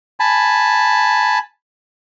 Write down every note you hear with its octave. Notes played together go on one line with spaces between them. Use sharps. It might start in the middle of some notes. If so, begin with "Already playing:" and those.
G#5 A5 B5